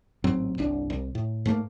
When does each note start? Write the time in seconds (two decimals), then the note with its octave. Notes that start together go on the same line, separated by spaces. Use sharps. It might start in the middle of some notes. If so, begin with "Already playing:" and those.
0.24 A1 G#2 F#3 C4
0.58 G1 C2 D4
0.90 C2
1.15 A2
1.45 G#2 A3 A#3